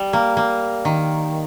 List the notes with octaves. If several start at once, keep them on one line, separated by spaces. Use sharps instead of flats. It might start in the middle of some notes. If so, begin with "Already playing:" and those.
Already playing: G3
A#3
A#3
D#3